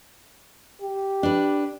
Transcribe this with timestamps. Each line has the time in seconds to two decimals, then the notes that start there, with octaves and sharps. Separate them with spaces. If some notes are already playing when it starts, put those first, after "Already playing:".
0.82 G4
1.23 D4 B4